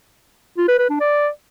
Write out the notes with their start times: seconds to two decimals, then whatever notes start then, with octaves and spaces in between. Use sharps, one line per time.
0.58 F4
0.68 B4
0.79 B4
0.90 D4
1.00 D5